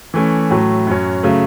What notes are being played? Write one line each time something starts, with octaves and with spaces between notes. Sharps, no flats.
E3 A3 C#4
A2 F#3 A3
F#2 F#3 C#4
C#3 F#3 A3